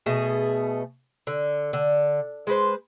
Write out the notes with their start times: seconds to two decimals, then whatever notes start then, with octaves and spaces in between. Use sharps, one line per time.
0.06 B2 A3 G#4
1.27 D3
1.73 D3
2.47 G#3 B4 C5